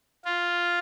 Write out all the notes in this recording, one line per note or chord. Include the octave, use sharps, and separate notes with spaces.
F4